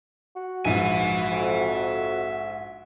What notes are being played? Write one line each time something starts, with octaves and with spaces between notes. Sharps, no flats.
F#4
A#1 G#2 E5 G#5
F2